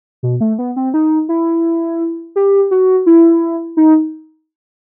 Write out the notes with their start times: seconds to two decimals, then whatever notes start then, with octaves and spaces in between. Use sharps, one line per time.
0.23 B2
0.41 A3
0.59 B3
0.76 C4
0.94 D#4
1.29 E4
2.36 G4
2.71 F#4
3.06 E4
3.77 D#4